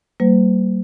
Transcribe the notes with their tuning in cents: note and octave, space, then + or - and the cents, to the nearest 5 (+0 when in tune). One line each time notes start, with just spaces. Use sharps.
G3 -45 A#3 -30 C5 -45